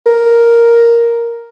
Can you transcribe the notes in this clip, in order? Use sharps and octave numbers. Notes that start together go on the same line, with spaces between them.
A#4